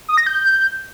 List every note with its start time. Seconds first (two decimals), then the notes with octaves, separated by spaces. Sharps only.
0.08 D#6
0.17 A#6
0.26 G6